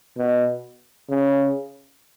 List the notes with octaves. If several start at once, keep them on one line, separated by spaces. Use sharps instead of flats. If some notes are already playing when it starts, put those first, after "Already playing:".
B2
C#3